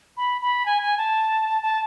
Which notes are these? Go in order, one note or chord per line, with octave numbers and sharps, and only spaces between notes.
B5
B5
G#5
G#5
A5
A5